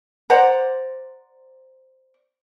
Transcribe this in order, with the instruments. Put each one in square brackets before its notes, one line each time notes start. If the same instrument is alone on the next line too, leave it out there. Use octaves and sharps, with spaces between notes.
[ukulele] C5 D5 F#5 A#5